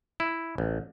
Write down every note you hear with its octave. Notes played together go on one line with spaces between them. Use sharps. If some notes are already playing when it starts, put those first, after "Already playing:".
E4
A1